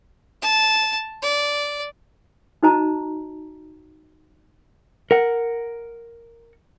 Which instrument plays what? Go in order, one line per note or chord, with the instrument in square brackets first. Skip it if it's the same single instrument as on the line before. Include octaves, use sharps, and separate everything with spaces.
[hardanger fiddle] A5
D5
[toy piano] D#4 F#4 C5 D#5 A5 A#5
[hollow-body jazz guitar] A#4 F#5